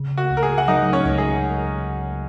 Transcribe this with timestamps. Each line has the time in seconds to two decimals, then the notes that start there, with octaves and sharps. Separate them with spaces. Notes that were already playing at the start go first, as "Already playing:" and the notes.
Already playing: C#3
0.18 F#4
0.30 C#2
0.37 A#4
0.43 G#4
0.58 F#5
0.68 F#3 D#4 D#5
0.93 C#4 C#5
1.06 C#2
1.18 G#4